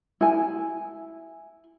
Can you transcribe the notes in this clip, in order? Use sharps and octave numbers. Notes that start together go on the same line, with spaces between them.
E4 G#5